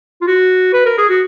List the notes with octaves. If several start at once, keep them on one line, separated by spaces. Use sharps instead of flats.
F4
F#4
B4
A#4
G#4
F#4